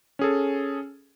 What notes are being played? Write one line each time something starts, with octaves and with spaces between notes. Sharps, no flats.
C#4 G#4 A4